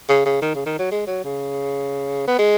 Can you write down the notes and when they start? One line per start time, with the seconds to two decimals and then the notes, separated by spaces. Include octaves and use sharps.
0.09 C#3
0.26 C#3
0.42 D#3
0.55 C#3
0.66 D#3
0.79 F#3
0.92 G#3
1.07 F#3
1.25 C#3
2.28 B3
2.39 G#3